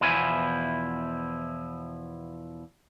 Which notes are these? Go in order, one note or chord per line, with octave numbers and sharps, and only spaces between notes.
E2 B2 F3 E4 G#5